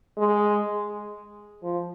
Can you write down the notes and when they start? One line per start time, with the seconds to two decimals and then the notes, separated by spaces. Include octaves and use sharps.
0.18 G#3
1.63 F3